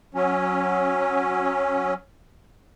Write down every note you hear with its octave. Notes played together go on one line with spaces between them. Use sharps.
F#3 C#4